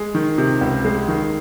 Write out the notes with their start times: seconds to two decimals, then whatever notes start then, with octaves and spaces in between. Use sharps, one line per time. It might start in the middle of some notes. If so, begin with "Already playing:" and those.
Already playing: G#3
0.15 D#3
0.38 C3
0.61 C#2
0.85 G#3
1.08 D#3